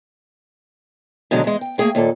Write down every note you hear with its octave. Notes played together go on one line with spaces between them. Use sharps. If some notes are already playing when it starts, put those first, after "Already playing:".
B2 D3 D#3 F#3 G#3
E2 G#3
G5
A3 A#3 G#4 G5
D#2 A#2 A4